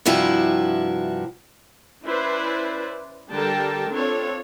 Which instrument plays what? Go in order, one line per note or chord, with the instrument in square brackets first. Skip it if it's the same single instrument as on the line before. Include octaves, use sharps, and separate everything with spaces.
[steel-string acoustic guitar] G2 C3 F3 E4 F#4
[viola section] C#4 E4 B4 C5 D5
D3 G3 A4 A#4 G5 A5
C4 D4 F4 A4 C#5